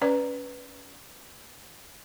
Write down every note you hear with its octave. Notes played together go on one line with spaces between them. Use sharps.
C#4 B4 D5